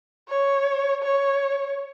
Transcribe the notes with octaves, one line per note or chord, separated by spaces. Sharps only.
C#5
C#5